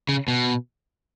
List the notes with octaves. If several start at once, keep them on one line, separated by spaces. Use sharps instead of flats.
C#3
B2